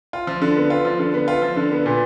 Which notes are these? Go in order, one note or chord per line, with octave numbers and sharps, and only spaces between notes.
F4
F3
D3
B3
F4
F3
D3
B3
F4
F3
D3
B3
A#2